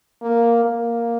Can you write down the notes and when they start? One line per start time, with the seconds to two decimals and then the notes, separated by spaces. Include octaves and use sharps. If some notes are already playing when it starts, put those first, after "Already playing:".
0.22 A#3
0.65 A#3